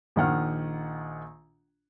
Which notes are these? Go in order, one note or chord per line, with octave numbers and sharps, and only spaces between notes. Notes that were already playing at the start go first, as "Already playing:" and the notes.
A#1 D#3 F#5 F6